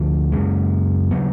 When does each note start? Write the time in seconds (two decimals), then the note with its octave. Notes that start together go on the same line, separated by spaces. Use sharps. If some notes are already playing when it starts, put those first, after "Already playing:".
Already playing: D2 D3 F3 A3
0.32 F#1 F#2 C#3 G#3
1.11 C#3 F#3 B3